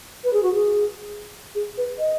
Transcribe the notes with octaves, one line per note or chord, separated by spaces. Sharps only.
B4
G#4
F#4
G#4
G#4
B4
D#5